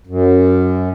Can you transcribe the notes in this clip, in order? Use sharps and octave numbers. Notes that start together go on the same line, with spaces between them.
F#2